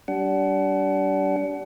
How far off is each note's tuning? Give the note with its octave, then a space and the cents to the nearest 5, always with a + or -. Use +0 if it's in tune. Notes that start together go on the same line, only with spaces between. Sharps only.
G3 -30 D4 -30 F#5 +30